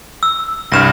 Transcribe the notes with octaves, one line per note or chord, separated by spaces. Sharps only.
E6
C2 G2 F6 A#6 E7